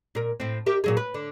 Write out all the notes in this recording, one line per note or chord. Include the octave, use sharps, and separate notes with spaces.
A#2 A#4
A2 C4
G4 A#4 E5
A#2 F#3 G#4
B4
D3